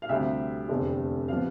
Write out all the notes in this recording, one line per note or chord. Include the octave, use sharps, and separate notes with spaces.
F5
D2 C3 G3 C4 E5
F1 E2 D3 A3 C4
C3 F3 B3 F5